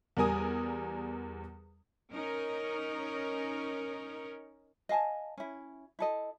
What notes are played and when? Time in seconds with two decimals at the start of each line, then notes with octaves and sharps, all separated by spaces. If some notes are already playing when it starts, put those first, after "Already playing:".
0.17 E2 G3 A#4 G#5 D#6
2.12 C#4 D#4 A#4
4.89 D#5 F5 G#5 A5
5.37 C#4 E4
5.99 E4 A4 D#5